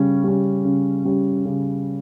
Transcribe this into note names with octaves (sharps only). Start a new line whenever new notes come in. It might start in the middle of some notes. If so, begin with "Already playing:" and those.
Already playing: C#3 G3 C#4
G3 C#4
C#3
G3 C#4
C#3